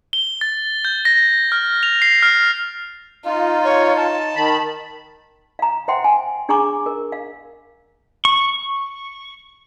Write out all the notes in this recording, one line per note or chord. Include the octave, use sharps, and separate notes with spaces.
G7
A6
G6
A#6
F6
F7
C7
F6
D#4 F4
C#5
A5
D#3 B5
F5 A#5
C5 E5 F#5 G5 C6
G#5
D4 G#4 G#5 A#5 C#6 D6
A#4
F5
C#6